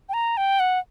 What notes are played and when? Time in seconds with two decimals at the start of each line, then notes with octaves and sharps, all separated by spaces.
0.09 G5
0.14 A#5
0.37 G5
0.60 F#5